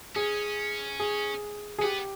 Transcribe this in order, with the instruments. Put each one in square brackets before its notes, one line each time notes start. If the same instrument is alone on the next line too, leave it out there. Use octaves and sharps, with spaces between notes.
[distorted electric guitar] C#4 [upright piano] G#4
[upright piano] G#4
G#4
[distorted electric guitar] B3 [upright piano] G4